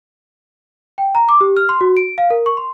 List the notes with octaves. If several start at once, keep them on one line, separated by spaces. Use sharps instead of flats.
G5
A#5
D6
G4
F6
C6
F#4
D7
F5
A#4
C#6
C6